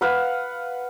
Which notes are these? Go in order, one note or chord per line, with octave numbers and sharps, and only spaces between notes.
B4 F5 F#5 B5